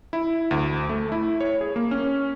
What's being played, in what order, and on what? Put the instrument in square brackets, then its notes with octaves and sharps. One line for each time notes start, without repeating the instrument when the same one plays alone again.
[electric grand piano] E4
D2
A3
E4
C#5
G#4
A#3
C#4